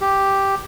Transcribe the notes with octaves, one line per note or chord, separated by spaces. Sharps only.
G4